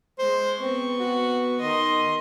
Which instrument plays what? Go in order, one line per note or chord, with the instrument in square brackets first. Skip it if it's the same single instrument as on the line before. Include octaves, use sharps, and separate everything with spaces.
[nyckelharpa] G#3 [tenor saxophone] C5
[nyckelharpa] B3 C#6 [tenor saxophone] C4
[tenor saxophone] F#4
[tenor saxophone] D#3 [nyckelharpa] D#5 C6